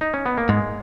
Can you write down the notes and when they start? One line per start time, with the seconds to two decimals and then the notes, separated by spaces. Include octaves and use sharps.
0.01 D#4
0.14 C#4
0.26 B3
0.37 A#3
0.49 G#2 G#3